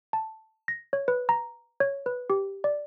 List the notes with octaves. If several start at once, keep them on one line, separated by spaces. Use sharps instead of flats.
A5
A#6
C#5
B4
A#5
C#5
B4
G4
D5